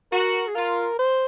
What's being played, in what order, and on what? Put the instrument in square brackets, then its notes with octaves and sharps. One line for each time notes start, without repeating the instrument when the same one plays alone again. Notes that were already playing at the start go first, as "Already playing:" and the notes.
[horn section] F#4 [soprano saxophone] A#4
[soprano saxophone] G#4
[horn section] F4 [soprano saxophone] A#4
[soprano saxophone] C5